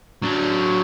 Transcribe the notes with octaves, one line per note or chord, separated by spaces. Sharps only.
F#3 D4